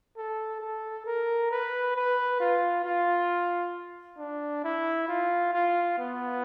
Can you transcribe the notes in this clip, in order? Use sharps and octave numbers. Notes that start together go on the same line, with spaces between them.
A4
A4
A#4
B4
B4
F4
F4
D4
E4
F4
F4
B3